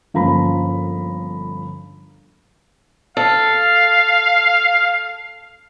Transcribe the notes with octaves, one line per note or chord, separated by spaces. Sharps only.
G1 F3 A#3 C#4 A#5 B5
A4 F5